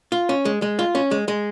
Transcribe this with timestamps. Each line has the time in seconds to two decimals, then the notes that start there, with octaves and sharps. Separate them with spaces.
0.12 F4
0.29 C#4
0.45 G#3
0.62 G#3
0.79 F4
0.95 C#4
1.11 G#3
1.28 G#3